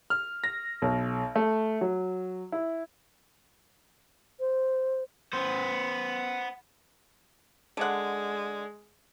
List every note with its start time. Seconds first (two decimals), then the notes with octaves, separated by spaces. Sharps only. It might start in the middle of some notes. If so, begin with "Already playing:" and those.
0.10 F6
0.44 A#6
0.82 B1
1.36 A3
1.81 F#3
2.52 E4
4.40 C5
5.33 B3 C5
7.77 D3 G#3 F#5